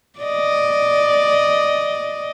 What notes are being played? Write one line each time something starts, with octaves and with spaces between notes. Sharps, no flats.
D5 D#5